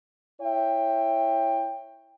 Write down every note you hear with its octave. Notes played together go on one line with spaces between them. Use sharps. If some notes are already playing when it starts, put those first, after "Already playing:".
E4 C#5 E5 G5